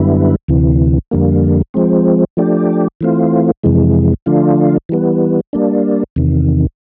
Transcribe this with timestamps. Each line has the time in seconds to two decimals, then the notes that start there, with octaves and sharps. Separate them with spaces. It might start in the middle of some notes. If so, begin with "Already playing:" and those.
Already playing: F#2 D3 G3 B3 E4
0.48 D2 C3 E3
1.11 F2 D3 G3 A#3
1.74 F3 G#3 C4
2.37 F3 A3 D4 G4
3.01 E3 A3 C4 F4
3.64 F2 C3 E3 G#3
4.26 D3 F3 A3 D4 F4
4.89 E3 G3 B3
5.53 G3 A#3 D4
6.16 E2 C3 D#3